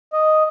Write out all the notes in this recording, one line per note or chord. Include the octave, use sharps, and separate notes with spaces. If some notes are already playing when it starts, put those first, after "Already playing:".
D#5